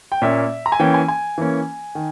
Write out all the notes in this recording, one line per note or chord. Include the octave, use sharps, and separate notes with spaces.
G5
A#2 A#3 C#4 E5
A#5
G#5
E3 A#3 C#4 G5
G#5
G#5
E3 A#3 C#4
D#3